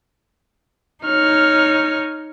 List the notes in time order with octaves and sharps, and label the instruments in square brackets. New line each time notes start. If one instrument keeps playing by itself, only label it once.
[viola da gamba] D#4 C#5 [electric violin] F6